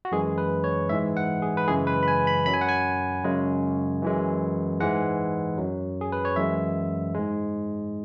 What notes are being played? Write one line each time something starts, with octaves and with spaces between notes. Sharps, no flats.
F#4
F#2 E3 G#3 G#4
B4
C#5
G#2 E3 G#3 E5
F#5
G#4
B4
F#2 C#3 E3 G#3 G#4
B4
B5
G#5
B5
F#2 F#3 B5
G#5
F#5
G#5
F#2 C#3 G#3
F#2 E3 G#3
G#2 E3 G#3 F#5
F#2 F#3
G#4
B4
C#5
F#2 E3 G#3 E5
G#2 G#3